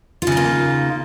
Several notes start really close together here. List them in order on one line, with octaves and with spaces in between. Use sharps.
F4 C#3 D#4 A#3